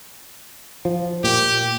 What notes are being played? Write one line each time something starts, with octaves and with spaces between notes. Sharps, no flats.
F3
A#2 G4